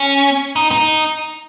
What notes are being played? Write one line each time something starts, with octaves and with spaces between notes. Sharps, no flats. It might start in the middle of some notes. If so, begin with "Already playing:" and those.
Already playing: C#4
D#4
D#4